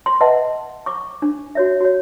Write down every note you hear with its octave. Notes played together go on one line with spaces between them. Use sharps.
C6
B4 D#5 E5 F#5 A5
C#6 D6
D4
F#4 C#5 E5
F#4 C#5